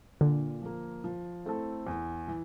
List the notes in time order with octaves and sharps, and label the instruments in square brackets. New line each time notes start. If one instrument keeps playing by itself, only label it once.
[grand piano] A#2 [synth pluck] D3
[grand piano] F3 A#3
F3
A3 C4 E4 A4
E2
E3